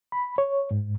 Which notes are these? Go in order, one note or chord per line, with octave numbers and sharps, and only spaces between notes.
B5
C#5
G#2